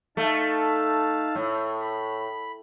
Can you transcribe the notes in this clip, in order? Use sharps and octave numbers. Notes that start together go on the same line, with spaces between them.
A3 D#4 F5 A5
A2
B5